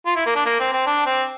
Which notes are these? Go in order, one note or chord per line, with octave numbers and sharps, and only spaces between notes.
F4
E4
A#3
D4
A#3
C4
C4
D4
C4